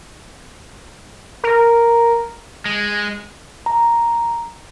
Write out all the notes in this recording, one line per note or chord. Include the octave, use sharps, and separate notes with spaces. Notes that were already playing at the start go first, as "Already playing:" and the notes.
A#4
G#3
A#5